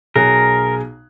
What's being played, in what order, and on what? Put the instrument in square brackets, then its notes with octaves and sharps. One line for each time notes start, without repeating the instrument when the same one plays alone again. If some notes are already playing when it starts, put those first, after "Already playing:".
[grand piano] B1 G#4 F#6 [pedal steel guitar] A#4